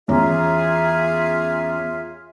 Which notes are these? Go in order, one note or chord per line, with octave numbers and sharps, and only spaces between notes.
E2 C#4 F4 G#4 E5 A#5